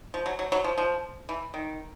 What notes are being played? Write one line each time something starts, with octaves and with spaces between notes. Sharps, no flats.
F3
F#3
F#3
F#3
F3
F3
E3
D#3